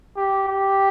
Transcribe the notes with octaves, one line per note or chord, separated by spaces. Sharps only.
G4
G4